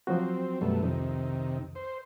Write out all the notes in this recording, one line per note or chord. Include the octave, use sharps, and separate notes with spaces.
F3 F#3 C4 F#4
F#2 B2 G3 A3
C2 F2 C3 D#3
C5